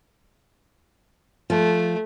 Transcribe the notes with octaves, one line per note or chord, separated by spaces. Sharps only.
F3 A3